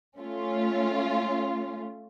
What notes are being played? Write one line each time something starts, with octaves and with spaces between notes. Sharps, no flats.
A3 C#4 F4